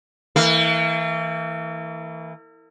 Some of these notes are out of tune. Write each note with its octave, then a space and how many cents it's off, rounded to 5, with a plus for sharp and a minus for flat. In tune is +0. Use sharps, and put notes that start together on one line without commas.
E3 -20 A#3 -45